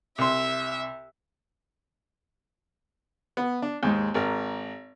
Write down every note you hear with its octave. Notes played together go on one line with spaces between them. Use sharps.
C2 E5 C6
B3
D4
D#2 G#2 G#3
G#1 A#4